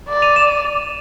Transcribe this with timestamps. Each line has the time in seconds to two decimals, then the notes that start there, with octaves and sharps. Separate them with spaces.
0.09 D5
0.22 D#7 F7
0.36 E7